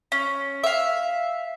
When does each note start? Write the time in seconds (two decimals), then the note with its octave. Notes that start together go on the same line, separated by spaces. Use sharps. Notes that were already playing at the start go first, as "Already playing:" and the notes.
0.12 C#4
0.64 E5 F5